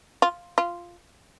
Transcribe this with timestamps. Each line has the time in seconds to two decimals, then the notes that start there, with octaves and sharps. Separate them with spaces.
0.22 F4
0.58 F4